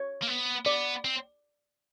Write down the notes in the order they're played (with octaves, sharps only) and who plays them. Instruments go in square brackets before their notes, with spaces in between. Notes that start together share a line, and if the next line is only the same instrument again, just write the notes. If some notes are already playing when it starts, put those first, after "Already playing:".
Already playing: [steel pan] C#5
[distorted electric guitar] A#3
B3
[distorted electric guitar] B3 [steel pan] D5
[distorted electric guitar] C4